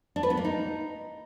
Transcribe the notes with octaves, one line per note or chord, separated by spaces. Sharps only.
D4
B4
B3
A#3
D#4